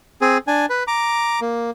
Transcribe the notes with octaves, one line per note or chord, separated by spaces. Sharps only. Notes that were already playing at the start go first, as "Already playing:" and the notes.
C4 G#4
D4 G#5
B4
A#5 D6
A#3